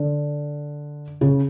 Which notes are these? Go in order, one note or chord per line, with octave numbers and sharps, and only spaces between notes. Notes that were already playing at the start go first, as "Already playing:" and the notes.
Already playing: D3
C#3